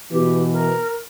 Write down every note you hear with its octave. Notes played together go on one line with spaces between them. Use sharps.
B2 E3 G4
A#4